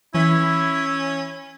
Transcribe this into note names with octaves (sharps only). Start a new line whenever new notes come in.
E3 C#4 E4 B5